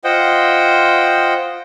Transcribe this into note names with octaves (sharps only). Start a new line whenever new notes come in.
F4 C5 D#5 F#5 G5